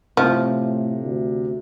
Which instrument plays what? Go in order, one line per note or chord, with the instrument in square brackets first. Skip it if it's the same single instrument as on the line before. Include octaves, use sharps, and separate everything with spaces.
[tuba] A2 [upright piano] C3 [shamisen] F3
[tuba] D2